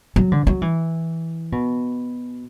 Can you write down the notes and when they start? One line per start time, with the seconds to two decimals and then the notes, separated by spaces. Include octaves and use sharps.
0.16 F#3
0.32 D3
0.47 F#3
0.62 E3
1.52 B2